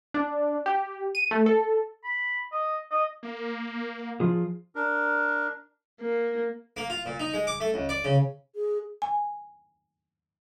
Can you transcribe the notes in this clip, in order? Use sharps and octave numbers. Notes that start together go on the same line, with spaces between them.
D4
G4
D#7
A3
A4
B5
D#5
D#5
A#3
F3 F4 G#4
D4 A#4
A#3
A#3
F4
A#2
D#4
G#3
D6
A3
C#2
D5
C#3
G#4
G#5